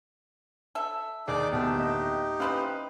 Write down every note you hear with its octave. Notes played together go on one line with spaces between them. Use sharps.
A4 E5
D#2 D#3 D#4 G#4 D5 D6
D1 D2 B3 D#4 G4 G5 A5
A#3 D#5
C4 C#4 E4 B4 C5 F5